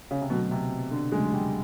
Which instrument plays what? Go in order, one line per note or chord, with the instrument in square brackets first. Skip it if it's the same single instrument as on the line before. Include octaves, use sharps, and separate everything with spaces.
[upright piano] C#3
C3
[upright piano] B2 [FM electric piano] D3 F#3 A3 C4
[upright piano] C3
D3
[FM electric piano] E2 C#3 F#3 A3 [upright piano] G#3
[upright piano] G3